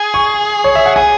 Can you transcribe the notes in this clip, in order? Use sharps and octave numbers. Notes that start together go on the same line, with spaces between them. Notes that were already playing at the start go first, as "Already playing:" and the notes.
Already playing: G#4
C#6
C#5
E5
F#5
G#4 G#5